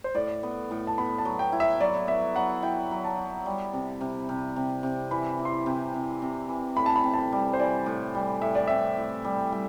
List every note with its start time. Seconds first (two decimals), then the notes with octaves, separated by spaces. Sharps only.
0.04 C5
0.14 A2 D5
0.43 B3
0.71 A2
0.87 A5
0.98 B3 B5
1.18 A5
1.25 F#3
1.39 G5
1.52 E4
1.60 E5
1.80 F#3 D5
2.07 B3 E5
2.36 F#3 F#5
2.63 E4 G5
2.91 F#3
3.04 A5
3.18 E4
3.46 G3
3.73 C3
4.01 C3
4.29 C3
4.56 C3
4.83 C3
5.11 E3 B5
5.39 E3
5.45 C6
5.52 B5
5.66 C3
5.94 C3
6.22 C3
6.49 E3
6.76 A2 B5
6.86 A5
6.96 B5
7.04 C4
7.14 A5
7.18 B5
7.32 G3
7.53 C5
7.59 E3 D5
7.86 A2
8.15 G3
8.41 A2 E5
8.55 D5
8.67 C4 E5
8.97 A2
9.25 G3
9.52 G3